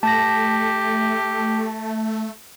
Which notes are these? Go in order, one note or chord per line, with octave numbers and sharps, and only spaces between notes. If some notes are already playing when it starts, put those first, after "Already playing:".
A3 G4 A5 A#6